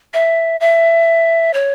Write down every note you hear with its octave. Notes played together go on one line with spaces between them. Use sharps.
E5
E5
C#5